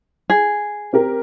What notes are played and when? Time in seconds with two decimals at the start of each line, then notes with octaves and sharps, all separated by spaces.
0.30 G#4
0.93 C4 G4 A#4